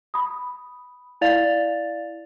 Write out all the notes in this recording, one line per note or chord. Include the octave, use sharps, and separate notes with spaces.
B5 D#6
E4 D5 F5 A6 F7